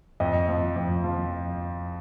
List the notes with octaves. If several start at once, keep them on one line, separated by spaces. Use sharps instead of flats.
F2 D#5
F3
F2
F3